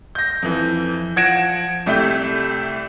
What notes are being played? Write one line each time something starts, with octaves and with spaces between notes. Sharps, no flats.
G6 A#6
F2 E3
F3 F#5 G#6 A#6 D7 E7
C2 A3 G4 E5 G6